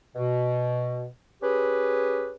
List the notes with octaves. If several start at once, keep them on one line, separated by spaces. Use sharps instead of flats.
B2
C#4 G4 G#4 B4